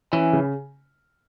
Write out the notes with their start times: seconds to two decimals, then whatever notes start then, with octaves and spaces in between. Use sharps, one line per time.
0.12 E3 C#4
0.33 C#3